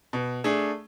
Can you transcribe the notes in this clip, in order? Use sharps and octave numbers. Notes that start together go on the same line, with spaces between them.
B2
A3 D4 G#4